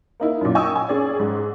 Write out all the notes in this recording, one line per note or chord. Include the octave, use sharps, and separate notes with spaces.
A#3 D#4 E4 A#4
F#2 A#2
D#5 G5 G#5 C#6 D#6 E6
G#5
C#4 G#4 D5
G#2